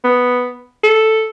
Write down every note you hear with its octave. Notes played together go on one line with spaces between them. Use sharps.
B3
A4